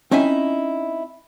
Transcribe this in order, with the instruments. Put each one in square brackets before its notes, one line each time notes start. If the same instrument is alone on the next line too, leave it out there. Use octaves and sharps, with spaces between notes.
[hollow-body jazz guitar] C4 C#4 D#4 E4 E5 G#5